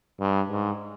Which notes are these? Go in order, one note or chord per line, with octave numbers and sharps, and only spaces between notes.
G2
G#2